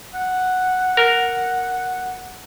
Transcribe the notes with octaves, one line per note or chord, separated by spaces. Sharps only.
F#5
A#4